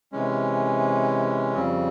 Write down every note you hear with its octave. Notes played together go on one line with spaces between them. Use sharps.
C3 E3 G#3 C#4
F2 C#3 G3 C4